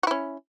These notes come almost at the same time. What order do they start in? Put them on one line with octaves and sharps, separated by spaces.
F#4 E4 C#4